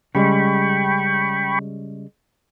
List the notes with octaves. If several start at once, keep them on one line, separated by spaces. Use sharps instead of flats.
C#3 G3 G#3 G5 B5 C#6